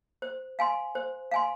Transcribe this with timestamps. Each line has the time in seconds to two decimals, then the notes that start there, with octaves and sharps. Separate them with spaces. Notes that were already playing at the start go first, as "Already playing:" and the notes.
0.22 C5
0.59 F5 G#5 C6
0.95 C5
1.31 F5 G#5 C6